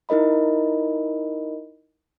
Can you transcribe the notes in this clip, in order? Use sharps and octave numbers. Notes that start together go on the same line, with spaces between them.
D#4 E4 A#4 D#5 B5